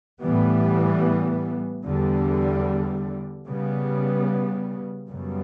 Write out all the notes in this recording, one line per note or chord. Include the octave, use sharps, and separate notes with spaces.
A2 E3 G3 B3
E2 D3 G3
C#3 G3 B3
F#2 C#3 G3 B3